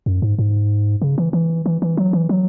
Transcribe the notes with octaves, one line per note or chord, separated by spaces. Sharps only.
F#2
G#2
G#2
C#3
E3
E3
E3
E3
F#3
E3
F#3